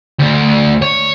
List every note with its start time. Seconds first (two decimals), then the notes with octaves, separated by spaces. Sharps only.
0.20 D2
0.82 C#5